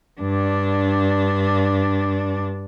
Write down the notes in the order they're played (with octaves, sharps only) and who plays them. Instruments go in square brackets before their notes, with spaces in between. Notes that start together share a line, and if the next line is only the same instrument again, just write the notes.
[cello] G2 D4